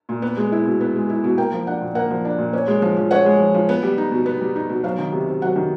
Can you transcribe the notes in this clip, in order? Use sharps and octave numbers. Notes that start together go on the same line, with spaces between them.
A#2
B3
G#3
E4
B2
B3
G#3
E4
B2
A#3 G5
F3
D4 F#5
A#2
A#3 F#5
F3
D4
A#2
C#4
G#3
F3
F3
C#4 F#5
G#3
F3
F3
B3
G3
D#4
B2
B3
G3
D#4
B2
F#3 F5
D#3
C3
C3
F#3 F#5
D#3